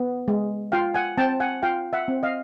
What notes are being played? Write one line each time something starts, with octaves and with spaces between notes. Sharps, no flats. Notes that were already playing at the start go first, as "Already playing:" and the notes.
Already playing: B3
G#3
F4 F5 G5
F#5 G#5
C4 G5 A5
F#5 G#5
F4 F5 G5
E5 F#5
C4
D#5 F5